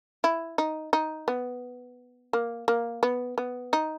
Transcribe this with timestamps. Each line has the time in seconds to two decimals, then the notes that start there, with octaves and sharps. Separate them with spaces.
0.24 E4
0.58 D#4
0.93 D#4
1.28 B3
2.33 A#3
2.68 A#3
3.03 B3
3.38 B3
3.73 D#4